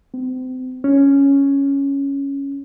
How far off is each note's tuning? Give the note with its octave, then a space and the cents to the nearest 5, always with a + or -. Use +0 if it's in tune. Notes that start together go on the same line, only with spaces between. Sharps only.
C4 -35
C#4 +0